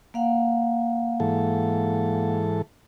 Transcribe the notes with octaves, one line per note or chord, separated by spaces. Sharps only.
A#3 F5 F#5
G#2 E3 A4